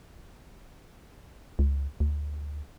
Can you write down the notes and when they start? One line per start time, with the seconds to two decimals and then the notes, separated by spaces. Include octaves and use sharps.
1.59 C#2
2.00 D2